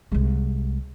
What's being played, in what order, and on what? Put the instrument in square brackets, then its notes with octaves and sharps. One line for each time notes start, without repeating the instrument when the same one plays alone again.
[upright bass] C2 G#3